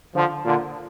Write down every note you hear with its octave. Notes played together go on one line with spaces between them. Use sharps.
D3 F3
A#2 D3